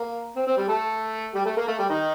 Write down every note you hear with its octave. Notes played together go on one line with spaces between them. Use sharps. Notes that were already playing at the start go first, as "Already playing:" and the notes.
Already playing: A#3
C4
C4
G3 G4
A3 A4
G3 G4
A3 A4
A#3 A#4
A3 A4
G3 G4
D#3 D#4